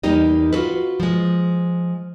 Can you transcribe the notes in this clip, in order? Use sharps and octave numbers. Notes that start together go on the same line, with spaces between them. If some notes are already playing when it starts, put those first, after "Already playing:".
E2 G3 A#3 D#4 G4 D#5
F4 F#4 A4 B4
F3 G#3